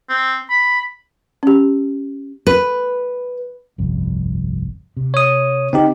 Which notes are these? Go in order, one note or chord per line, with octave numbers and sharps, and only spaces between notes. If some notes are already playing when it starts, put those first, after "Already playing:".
C4
B5
C#4 G4
B4
G1 C2 F2
C3
C#5 D#6
D3 C4 D#4 G4